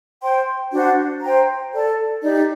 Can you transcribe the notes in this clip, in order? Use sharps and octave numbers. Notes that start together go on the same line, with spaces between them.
C5 G5 C6
D4 F#4 C5 F#5
C5 G5 A#5
A4 D5 A5
D#4 G4 D5